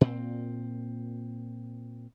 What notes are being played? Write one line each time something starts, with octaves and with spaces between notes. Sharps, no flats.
A#2 C4